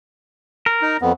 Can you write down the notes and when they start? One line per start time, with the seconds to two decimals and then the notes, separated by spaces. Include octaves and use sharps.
0.66 A#4
0.82 D#4
1.02 F2 B3